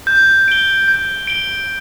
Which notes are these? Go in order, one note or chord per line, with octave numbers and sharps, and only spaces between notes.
G6
D7 G7
G6
D7 G7